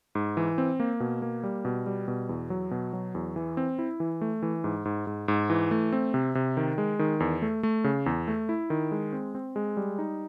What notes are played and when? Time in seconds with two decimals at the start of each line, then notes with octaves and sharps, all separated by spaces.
0.15 G#2
0.37 E3
0.58 C4
0.80 A#3
1.00 B2
1.22 A#3
1.44 G3
1.65 B2
1.86 G3
2.08 B2
2.29 E2
2.50 F#3
2.71 B2
2.93 F#3
3.15 E2
3.36 E3
3.57 C4
3.79 E4
4.00 E3
4.21 A3
4.42 E3
4.64 G#2
4.85 G#2
5.07 G#2
5.28 G#2
5.50 E3
5.71 A3
5.92 C4
6.14 C3
6.35 C3
6.57 D#3
6.78 G#3
6.99 D#3
7.20 E2
7.42 A3
7.63 A3
7.84 C#3
8.06 E2
8.28 A3
8.49 E4
8.70 D#3
8.92 G#3
9.13 C4
9.35 C4
9.56 G#3
9.77 G3
9.99 D#4